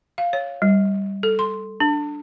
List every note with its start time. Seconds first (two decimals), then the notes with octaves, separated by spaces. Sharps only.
0.18 F5
0.33 C#5
0.62 G3
1.23 A4
1.39 C6
1.80 D4